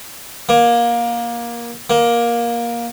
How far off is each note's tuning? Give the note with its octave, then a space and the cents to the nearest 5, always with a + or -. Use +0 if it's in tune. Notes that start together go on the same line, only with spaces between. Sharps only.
A#3 +20
A#3 +15